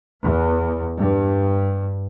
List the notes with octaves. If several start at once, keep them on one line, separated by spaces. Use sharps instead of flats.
E2
G2